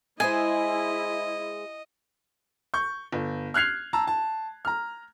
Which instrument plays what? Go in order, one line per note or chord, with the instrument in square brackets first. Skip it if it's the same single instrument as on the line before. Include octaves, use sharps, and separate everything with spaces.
[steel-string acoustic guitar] G#3 G#4 C5 [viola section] E4 [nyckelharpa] D#5 [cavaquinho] G#5
[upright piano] C#6 G6
G1
F6 F#6 G#6 C7 F7
A5 A#5 E6
A5
A#5 F6